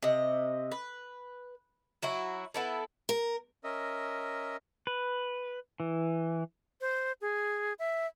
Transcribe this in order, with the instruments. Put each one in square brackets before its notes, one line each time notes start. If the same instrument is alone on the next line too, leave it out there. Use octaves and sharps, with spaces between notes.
[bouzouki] C3 D#5
B4
F#3 E4 F#4
B3 E4 A4
[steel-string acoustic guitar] A#4
[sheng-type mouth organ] C#4 A#4 D#5 E5
[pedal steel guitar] B4
E3
[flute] C5
G#4
E5